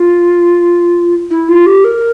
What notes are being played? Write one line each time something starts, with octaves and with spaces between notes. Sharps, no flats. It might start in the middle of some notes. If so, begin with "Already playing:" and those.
Already playing: F4
E4
F4
G4
A#4